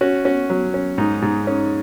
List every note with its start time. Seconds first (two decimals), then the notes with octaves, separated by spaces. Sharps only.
0.01 C#4 F#4
0.25 C#4 F#4
0.50 F#3
0.74 C#4
0.98 G#2 D#4
1.22 G#2
1.47 C#4